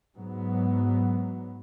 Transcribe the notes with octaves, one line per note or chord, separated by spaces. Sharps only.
G#2 F#3 B3